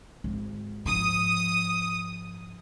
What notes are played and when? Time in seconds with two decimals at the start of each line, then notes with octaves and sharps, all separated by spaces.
0.24 G#1
0.85 G#2 F3 D#6